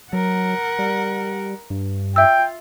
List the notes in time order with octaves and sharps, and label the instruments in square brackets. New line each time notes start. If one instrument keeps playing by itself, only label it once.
[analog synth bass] F#3 [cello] A#4 F#5
[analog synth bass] G3
G2
[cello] F4 [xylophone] E5 E6 [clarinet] G5